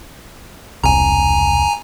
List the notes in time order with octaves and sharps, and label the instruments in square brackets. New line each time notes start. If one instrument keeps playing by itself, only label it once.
[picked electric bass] E1 C2 [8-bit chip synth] G#5 A#5